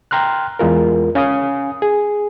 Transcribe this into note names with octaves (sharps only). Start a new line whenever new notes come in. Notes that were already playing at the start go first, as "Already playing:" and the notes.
G5 A#5 C6 F6 F#6
E2 G#3 F4 A#4
C#4 F5 G#5 D#6
G#4